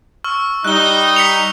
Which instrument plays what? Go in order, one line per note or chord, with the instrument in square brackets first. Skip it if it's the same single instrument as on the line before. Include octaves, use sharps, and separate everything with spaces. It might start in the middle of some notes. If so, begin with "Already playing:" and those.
[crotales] C#6 E6 F6
[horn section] G3 D#4 [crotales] F#6 G7
[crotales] B6 C#7 F7